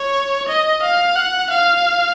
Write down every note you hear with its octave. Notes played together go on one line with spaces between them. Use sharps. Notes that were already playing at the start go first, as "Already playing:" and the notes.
Already playing: C#5
D#5
F5
F#5
F5